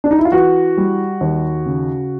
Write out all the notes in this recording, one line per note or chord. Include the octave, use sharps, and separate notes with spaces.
D4
D#4
E4
F4
E3 F#4
G3
D#2
C#3